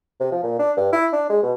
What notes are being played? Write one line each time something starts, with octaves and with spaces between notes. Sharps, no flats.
C3
F3
A#2
D4
G2
E4
D4
G#3
B2